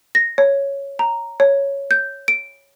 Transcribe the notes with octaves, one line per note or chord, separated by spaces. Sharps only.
A#6
C#5
A#5
C#5
G6
D7